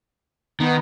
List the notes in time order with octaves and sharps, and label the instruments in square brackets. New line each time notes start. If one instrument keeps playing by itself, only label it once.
[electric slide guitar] D#3 [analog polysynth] B3 D#4